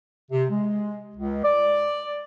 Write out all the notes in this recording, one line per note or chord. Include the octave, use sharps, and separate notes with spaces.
C3
G#3
C#2
D5